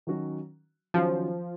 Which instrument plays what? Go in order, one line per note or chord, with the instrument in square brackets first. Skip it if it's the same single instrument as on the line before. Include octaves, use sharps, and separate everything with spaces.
[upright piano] D#3 F#3 C#4 F#4
[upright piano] D#3 F#3 C#4 F#4 [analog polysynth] F3